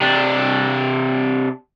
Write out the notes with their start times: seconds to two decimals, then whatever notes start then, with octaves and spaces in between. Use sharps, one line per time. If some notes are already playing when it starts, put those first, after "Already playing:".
0.01 C3 D4